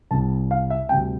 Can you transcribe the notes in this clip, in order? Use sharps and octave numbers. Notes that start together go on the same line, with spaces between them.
C2 C3 G3 A5
F5
E5
D2 C3 G3 G5